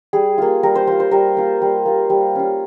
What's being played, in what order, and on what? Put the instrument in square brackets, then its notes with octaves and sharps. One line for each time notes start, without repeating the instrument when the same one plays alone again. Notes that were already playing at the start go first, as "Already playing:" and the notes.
[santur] G3 G#4
A#3 F4
G3 A#4
C5
A#3 F4 C5
C5
G3 A#4
A#3 F4
G3
A#3 F4
G3
C#4 F4